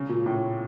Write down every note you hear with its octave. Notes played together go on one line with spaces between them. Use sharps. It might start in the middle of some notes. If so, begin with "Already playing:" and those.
Already playing: C#3
A#2
A2